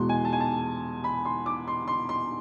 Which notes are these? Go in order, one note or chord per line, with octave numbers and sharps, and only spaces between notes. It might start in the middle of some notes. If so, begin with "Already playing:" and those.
Already playing: E2 B2 G#3 C6
G#5
A5
G#5
A5
B5
C6
D6
C6
C6
C6